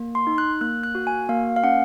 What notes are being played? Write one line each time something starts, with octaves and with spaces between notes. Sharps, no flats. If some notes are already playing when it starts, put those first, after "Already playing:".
Already playing: A#3
C6
D#4
F#6
A#3 F#6
F#6
F#4
G#5
A#3 F5
F5
C#4 F#5